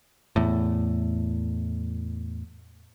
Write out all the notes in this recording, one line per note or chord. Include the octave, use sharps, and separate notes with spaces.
E2 A2